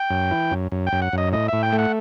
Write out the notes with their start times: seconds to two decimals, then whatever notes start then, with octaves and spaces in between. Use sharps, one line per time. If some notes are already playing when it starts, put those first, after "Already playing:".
Already playing: G5
0.10 F#2
0.31 E3
0.51 F#2
0.72 F#2
0.87 G5
0.93 F#2
1.02 F#5
1.13 F#2
1.18 D#5
1.33 A2 D#5
1.48 A2 E5
1.63 G5
1.72 A3
1.79 F#5